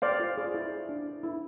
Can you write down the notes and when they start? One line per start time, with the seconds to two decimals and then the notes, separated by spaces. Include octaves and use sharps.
0.02 C5 D5 F5
0.20 F4
0.37 G#4
0.54 E4
0.71 C5
0.89 D4
1.06 E4
1.23 E4